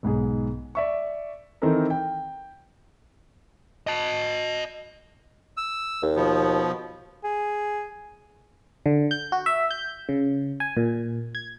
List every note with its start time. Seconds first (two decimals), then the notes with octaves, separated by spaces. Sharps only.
0.03 B1 G#2 B3 G#4
0.75 D5 E5 C#6
1.62 D#3 E3 C4 D#4 A4 A#4
1.90 G5
3.87 D#5 A5
5.57 E6
6.02 D#2
6.16 B2 F3 B3
7.24 G#4
8.86 D3
9.11 G6
9.32 F#4
9.46 E5
9.71 G6
10.09 C#3
10.60 G#5
10.77 A#2
11.35 G#6